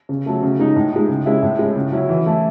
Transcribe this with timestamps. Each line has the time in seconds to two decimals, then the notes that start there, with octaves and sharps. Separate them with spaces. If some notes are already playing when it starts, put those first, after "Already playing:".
0.09 C#3
0.26 F#3 A3
0.43 C#3
0.59 G#3 D#4
0.76 A2
0.92 G#3 D#4
1.09 C#3
1.26 G#3 C#4 E4
1.42 A2
1.59 G#3 C#4 E4
1.76 C#3
1.92 F#3 C#4 E4
2.09 E3
2.26 A3 E4